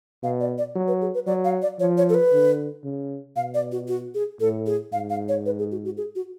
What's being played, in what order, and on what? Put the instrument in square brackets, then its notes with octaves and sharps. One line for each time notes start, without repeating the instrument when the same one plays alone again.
[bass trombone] B2 [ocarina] F5
[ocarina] D5
D5
[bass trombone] F#3
[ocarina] B4
G#4
B4
[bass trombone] F#3 [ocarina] D5
[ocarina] F5
D5
[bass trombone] F3 [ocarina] C#5
[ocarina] C#5
A4
B4
[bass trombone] D3
C#3
[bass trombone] B2 [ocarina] F5
[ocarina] D5
F#4
F#4
G#4
[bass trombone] A2 [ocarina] A4
[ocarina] G#4
[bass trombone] G#2 [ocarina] F5
[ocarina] F5
C#5
B4
G#4
F#4
F#4
G#4
F#4